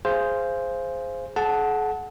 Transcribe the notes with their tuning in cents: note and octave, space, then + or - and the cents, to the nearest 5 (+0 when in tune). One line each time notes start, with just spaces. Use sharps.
G#4 +0 C5 +0 F5 -25
G#4 +45 F#5 +0 A5 +0